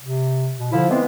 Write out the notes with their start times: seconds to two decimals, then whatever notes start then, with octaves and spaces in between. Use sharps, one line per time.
0.02 C3
0.59 B2
0.72 D3 F3 E4
0.90 E3 G#3 B3 C4